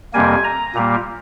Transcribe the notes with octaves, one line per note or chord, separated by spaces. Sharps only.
F2 C3 G3 A#3 G#5
A#5
A#2 G3 A#3